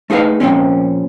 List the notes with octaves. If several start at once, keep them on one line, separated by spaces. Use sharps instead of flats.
A3 D#4 G#4 B4 F5
A#2 F3 C4 C#4